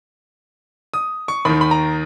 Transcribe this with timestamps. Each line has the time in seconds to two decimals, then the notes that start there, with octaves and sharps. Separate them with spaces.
0.94 D#6
1.28 C#6
1.45 D#2 D#3 B5
1.61 B5
1.71 A#5